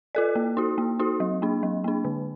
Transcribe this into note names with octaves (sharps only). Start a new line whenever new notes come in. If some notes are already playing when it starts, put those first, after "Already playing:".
F4 A4 D5
A#3
D#4 F#4
A#3
D#4 F#4
F#3
A#3 D4
F#3
A#3 D4
D3